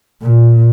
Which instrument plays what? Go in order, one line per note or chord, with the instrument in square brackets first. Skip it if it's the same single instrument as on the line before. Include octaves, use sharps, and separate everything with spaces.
[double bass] A#2